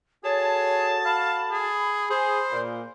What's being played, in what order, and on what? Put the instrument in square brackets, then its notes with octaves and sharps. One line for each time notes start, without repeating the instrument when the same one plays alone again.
[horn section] F#4 A4 A5 [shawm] G#4 [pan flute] C#5
[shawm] F5 [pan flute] B5
[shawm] G#4
[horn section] G#4 [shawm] C5
[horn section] A#2